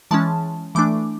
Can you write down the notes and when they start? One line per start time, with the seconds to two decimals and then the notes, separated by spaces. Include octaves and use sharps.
0.11 E3 G#3 C#4 A5
0.75 E3 A3 D4 D6